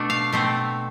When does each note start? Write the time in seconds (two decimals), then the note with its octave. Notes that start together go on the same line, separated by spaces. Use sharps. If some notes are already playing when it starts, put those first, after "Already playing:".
Already playing: B2 A3 D4
0.10 F5
0.32 B2 A3 C4